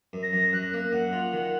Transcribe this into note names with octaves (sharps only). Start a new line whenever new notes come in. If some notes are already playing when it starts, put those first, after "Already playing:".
F#2
A#6
F#2
F#2 F#6
A#3
F#2 F#5
F4
D#3